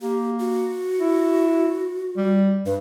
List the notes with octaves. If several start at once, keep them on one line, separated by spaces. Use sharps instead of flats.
A#3 G4
F#4
E4
G3
G2 B4